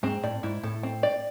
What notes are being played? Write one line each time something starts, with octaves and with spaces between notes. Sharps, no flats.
G#2 C4
A2 D5
G#2 E4
A2 A4
C4
D5